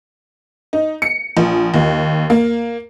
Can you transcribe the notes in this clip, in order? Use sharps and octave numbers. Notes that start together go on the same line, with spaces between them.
D#4
C#7
A#1
D#2
A#3